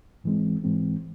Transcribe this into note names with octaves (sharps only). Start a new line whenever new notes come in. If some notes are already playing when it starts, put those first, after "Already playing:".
G#2 E3 G#3 C4
G#2 E3 G#3 C4